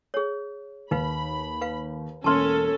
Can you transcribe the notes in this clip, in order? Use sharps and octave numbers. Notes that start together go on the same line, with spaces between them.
G#4 C#5
D#2 D#4 B4 F5 B5
B4 F5
E1 A#3 C#4 A4 A5 C6 F6